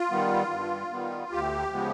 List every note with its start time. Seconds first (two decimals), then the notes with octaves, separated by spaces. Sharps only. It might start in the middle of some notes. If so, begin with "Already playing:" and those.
Already playing: F4
0.11 D#3 G3 B3
0.51 G2
0.92 D#3 G3 B3
1.32 D2 G4
1.73 C#3 F3 G#3 B3